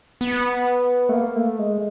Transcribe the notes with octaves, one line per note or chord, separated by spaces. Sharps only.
B3
A3
A#3
A3
G#3